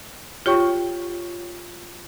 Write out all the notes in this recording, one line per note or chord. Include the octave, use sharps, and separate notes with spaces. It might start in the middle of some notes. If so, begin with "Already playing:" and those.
F4 G4 C#5 G5 C#6